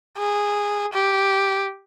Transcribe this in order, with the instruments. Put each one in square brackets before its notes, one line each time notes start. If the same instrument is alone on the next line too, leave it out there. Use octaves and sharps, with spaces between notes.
[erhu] G#4
G4